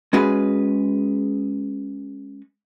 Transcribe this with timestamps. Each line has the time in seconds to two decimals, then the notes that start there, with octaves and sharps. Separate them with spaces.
0.13 G#3 C#4 F#4 G#4 B4